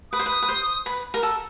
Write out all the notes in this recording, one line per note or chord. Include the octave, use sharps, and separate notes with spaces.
B4 D#6
C5
B4
B4
C5
B4
A#4
A4